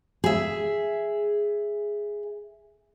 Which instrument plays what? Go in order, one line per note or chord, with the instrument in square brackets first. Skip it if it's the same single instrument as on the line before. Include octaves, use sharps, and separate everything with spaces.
[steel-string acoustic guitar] G#4 E5